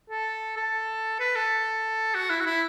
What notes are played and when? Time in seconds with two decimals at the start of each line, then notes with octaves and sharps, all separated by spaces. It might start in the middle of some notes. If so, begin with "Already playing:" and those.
0.10 A4
0.57 A4
1.20 B4
1.36 A4
2.14 F#4
2.30 E4
2.41 F#4
2.46 E4